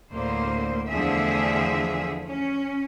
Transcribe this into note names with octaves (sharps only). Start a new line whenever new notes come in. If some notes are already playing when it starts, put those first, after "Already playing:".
D2 A2 A#3 C5
E2 D3 F3 A3 G#4 E5
C#4